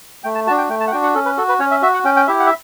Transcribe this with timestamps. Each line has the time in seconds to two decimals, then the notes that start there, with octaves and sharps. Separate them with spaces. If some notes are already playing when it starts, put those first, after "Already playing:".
0.24 A3 G5
0.35 A5
0.47 F#4 A5
0.50 D4
0.58 G5
0.69 A3 G5
0.80 A5
0.88 F#5
0.91 D4 F#4 G5
1.03 F#5
1.15 C#4 A4
1.25 B4
1.37 F#4 A4
1.49 B4
1.59 C#4 C#5
1.71 E5
1.82 F#4 E5
1.94 F#5
2.04 C#4 G5
2.16 G5
2.27 E4 G4 E5
2.39 F#5
2.46 E5